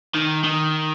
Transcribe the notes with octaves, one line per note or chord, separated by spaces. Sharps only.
D#3
D#3